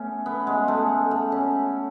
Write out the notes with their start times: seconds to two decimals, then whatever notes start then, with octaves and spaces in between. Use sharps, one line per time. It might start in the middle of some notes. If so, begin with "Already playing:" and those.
Already playing: A3 B3 C#4
0.26 B3
0.47 G#3
0.68 A3
1.11 A3
1.32 C#4